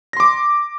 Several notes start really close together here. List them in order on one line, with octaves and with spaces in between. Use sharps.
A#6 C6 D6